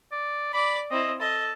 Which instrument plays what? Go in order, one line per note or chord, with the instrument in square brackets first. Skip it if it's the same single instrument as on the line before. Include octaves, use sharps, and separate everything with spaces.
[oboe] D5
[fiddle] D5 D6 [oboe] B5
[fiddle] C4 E4 [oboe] D#5
[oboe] A4 [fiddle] D#5